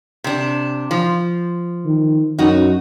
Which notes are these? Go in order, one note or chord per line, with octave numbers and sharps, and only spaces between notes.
C3 D4
F3
D#3
F#2 D#4 F#4